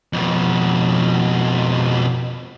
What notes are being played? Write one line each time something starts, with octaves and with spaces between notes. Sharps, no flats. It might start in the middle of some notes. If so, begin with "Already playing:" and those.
F2 B2